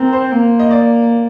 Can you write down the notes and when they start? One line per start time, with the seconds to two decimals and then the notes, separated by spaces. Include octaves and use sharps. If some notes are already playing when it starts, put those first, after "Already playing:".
Already playing: C4 A#4
0.13 C5
0.32 A#3
0.59 D#5
0.71 D5